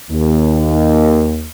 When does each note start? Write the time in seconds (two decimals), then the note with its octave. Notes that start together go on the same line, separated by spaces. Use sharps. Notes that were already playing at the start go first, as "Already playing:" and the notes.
0.11 D#2